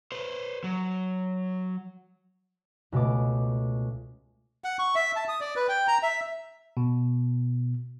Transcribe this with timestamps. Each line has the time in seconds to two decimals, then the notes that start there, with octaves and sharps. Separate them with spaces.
0.12 B4 C5
0.64 F#3
2.92 C#2 B2 A3 D6
4.64 F#5
4.79 C#6
4.95 E5
5.16 A5
5.29 D#6
5.41 D5
5.56 B4
5.69 G5
5.87 A#5
6.03 E5
6.77 B2